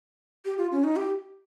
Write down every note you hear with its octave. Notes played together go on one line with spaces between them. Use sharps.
G4
F4
C#4
D#4
G4